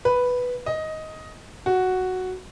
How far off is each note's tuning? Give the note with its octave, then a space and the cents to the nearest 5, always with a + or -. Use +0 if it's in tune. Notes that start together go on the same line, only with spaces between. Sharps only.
B4 +0
D#5 +10
F#4 +0